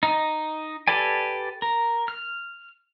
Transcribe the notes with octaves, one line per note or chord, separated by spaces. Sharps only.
D#4
G4 A4 B4 D5 G#5
A#4
F6